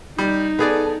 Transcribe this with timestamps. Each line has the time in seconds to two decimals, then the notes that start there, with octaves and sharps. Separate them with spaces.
0.18 G3 D#4
0.59 B3 G#4 A4 D5